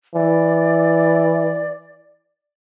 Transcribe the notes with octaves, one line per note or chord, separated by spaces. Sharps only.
E3 D5